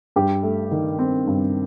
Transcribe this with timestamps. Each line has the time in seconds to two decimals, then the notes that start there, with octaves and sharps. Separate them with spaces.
0.16 G2 G4
0.43 A3
0.71 D#3
0.99 C4
1.27 G2